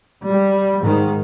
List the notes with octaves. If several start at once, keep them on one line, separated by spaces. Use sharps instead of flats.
G3
G#2 D#3